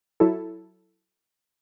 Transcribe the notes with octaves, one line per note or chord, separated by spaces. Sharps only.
F#3 E4 A4